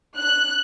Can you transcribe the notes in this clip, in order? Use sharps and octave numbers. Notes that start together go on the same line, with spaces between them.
F#6